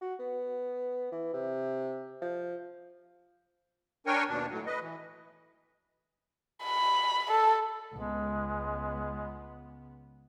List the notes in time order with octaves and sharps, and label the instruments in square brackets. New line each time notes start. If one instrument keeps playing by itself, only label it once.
[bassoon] F#4
B3
E3
C3
F3
[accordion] D4 A#4 C#5 G5 G#5 C#6
D#2 B2 D4
A2 F#3
B4 D#5
E3
[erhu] B5
A4
[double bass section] C#2 B3 [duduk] G#3